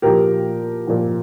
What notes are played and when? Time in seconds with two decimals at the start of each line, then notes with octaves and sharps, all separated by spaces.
0.02 A#2 F3 G4 A#4
0.87 A#2 F3